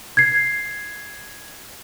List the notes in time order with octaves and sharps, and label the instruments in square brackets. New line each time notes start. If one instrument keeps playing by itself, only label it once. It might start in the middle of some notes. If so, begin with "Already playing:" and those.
[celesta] G#6 C7